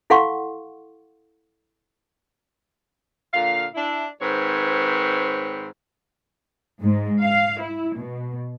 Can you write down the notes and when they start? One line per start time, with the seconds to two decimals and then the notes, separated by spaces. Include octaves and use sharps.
0.10 E4 A4 F5 F#5 C6 C#6
3.33 A#2 D3 F5
3.74 D4 E4
4.20 G#2 D#3 C4 B4 C#5
6.81 G#2
7.22 F5
7.60 E4
7.97 B2